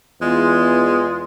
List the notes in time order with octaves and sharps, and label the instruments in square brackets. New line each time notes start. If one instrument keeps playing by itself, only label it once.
[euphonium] E2 [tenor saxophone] G#3 [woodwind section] F4